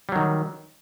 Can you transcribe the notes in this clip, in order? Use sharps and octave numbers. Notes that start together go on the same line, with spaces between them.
D#3 F#3 G3